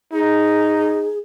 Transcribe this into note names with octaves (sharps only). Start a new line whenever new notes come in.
D#4 G#4